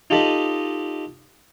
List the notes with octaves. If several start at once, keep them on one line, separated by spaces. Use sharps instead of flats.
D#4 F4 G4 A4 D#5 B5